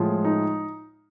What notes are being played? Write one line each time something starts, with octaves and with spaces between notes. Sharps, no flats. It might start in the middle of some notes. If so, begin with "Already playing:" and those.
Already playing: A2 F3 G#3
D#4